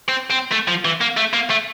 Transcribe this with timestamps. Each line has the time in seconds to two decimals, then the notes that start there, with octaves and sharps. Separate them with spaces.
0.09 C4
0.30 C4
0.52 A3
0.68 F3
0.85 E3
1.01 A#3
1.17 A3
1.33 A#3
1.50 A3